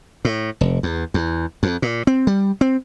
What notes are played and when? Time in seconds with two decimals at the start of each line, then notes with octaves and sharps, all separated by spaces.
0.25 A2
0.61 F1
0.83 E2
1.14 E2
1.63 F2
1.82 A#2
2.07 C4
2.27 G3
2.61 C4